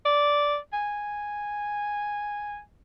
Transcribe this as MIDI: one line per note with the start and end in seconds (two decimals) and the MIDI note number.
0.05 0.57 74
0.73 2.60 80